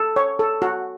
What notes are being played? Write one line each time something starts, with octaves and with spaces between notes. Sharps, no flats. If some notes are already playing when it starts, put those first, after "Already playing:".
Already playing: A4
C#5
A4
F#4